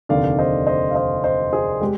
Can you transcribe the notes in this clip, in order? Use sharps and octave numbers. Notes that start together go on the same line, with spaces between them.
F1 D#2 D3 D5 F5
C5 D#5
C5 D#5
F5
C5 D#5
C5 D#5
G#4 C5
G#3 G4